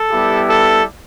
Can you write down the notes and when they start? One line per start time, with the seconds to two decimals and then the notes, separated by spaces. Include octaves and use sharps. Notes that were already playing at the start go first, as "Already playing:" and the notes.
Already playing: A4
0.11 G3 B3 E4 G4
0.48 A4